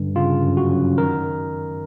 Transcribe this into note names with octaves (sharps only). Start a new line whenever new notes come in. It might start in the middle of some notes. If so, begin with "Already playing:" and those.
Already playing: G2 D3
C#3 F4
F#2
F#4
F#2
D#3 A#4